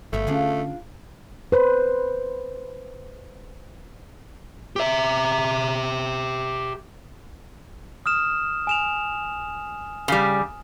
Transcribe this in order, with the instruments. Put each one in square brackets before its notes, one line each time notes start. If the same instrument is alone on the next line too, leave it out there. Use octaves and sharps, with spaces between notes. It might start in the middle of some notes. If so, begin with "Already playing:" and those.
[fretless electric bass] G1 [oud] C#3 C#5 E5 [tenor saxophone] A3
[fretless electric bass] D3 C#4 [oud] D4 F4 G#4
[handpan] B4 C5
[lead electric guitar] G4 E5
[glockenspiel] D#6 F6 E7
G#5 E7 F7
[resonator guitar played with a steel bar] C#3 G3